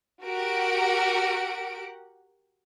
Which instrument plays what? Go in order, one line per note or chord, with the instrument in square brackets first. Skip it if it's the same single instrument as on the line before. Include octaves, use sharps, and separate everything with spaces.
[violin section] F#4 G4 A#4 F#5 D7